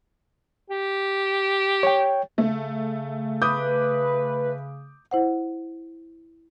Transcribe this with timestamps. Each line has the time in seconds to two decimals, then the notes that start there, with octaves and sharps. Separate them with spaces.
0.70 G4
1.83 C#5 G5
2.38 C#3 A3
3.42 B4 D6 D#6 G6
5.11 E4 C5 F#5